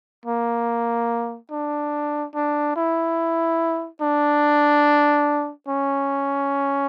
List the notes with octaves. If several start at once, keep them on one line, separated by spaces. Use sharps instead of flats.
A#3
D4
D4
E4
D4
C#4